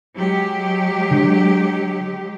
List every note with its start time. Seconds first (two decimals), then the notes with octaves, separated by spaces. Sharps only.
0.17 F#3 G#3 G4
1.11 D3